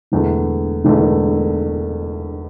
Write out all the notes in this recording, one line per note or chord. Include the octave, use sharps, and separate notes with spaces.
E1 E2 D3 A3
E1 E2 D3 A3